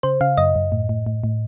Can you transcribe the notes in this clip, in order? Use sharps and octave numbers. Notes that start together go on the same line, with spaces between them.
C#3 C5
C#3 F5
F#2 D#5
F#2
A2
A2
A2
A2